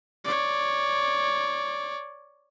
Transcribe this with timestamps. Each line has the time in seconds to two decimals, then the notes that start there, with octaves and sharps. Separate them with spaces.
0.25 C#5 D5